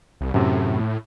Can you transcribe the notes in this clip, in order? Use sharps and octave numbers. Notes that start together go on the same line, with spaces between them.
C2
F#2 A2 C3